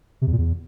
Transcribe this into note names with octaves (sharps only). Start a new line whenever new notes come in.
C3
E2
A#2
E2